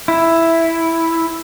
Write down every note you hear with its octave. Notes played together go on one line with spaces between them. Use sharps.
E4